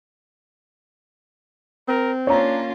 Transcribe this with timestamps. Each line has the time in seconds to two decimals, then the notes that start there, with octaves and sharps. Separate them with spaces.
1.88 C4 A#4
2.27 A#3 C#4 D4 F4 C#5 A#5